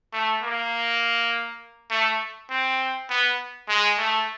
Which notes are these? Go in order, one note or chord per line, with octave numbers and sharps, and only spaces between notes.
A3
A#3
A3
C4
B3
G#3
A3